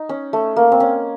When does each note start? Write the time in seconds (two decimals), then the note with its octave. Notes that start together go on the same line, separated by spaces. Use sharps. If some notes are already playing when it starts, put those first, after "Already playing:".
Already playing: D#4
0.09 C#4
0.33 A3
0.56 A#3
0.72 C4
0.80 C#4